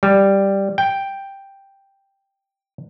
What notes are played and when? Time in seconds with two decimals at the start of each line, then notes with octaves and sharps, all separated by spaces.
0.03 G3
0.78 G5